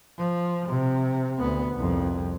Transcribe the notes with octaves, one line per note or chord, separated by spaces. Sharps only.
F3
C3
D2 B3
C2 F2